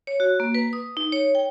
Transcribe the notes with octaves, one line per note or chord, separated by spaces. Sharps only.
C#5
F#4
A#3
B4
D#6
D#4
C#5
G5